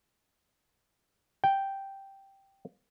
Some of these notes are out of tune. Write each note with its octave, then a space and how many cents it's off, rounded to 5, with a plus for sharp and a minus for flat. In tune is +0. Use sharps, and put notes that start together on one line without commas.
G5 -5